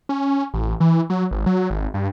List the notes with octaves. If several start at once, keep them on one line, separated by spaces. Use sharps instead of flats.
C#4
A1
E3
F#3
G#1
F#3
G#1
G2